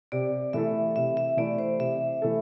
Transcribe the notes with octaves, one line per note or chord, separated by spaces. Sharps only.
C3 D5
E3 A3 E4 A4 E5
C3 E5
E5
E3 A3 E4 A4 D5
C5
C3 E5
E3 A3 E4 A4